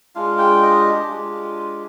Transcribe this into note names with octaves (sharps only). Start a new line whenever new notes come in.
G#3 D4 F4 F5
G5
D#5
G4
G#3 D4 F4